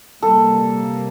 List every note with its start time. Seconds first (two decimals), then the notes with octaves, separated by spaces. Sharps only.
0.22 C3 G3 A#3 A4